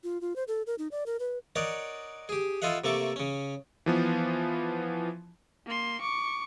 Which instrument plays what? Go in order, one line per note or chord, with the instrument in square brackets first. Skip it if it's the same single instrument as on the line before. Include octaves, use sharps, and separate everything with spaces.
[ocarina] F4
F4
C5
A4
A#4
D#4
D5
A#4
B4
[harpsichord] D#4 A#4 C#5 D5 F#5
G4 G#4
E4 F4 A4 D#5 F5 F#5
C3 A3 A#3 A4 C#6 D6
C#3 C#4
[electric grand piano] E3 F3 B3
[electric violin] A#3 C6
C#6 D6